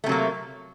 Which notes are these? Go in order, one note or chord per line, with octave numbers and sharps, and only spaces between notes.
C3 F#3 A3 A#3